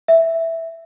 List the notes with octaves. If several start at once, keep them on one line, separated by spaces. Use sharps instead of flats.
E5